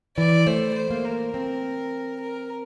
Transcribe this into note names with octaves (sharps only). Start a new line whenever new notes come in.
E3 D5
A3 C5
C5
A#3
A#4
C4
A#4